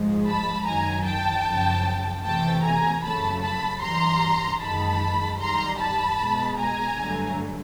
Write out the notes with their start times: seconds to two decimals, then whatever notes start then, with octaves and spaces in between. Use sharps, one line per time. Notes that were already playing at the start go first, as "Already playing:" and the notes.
Already playing: G#2 F3 G#3
0.26 A5 B5
0.65 F#2 D#3 F#3 G#5 A#5
1.04 G5 A5
1.44 F#2 C#3 F3
2.23 C3 E3 A3 G5 A5
2.63 G#5 A#5
3.02 F#2 C#3 F#3 A3 A5 B5
3.41 A5 B5
3.81 G2 E3 G3 A#5 C6
4.60 F#2 D#3 G#3 A5 B5
5.38 F#2 D#3 G3 A#5 C6
5.78 A5 B5
6.17 B2 G#3
6.57 G#5 A#5
6.96 G2 D3 F#3 A3